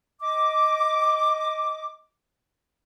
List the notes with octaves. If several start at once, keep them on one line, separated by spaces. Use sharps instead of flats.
D#5 D6